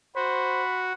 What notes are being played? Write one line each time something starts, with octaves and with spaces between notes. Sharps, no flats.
F#4 C5 B5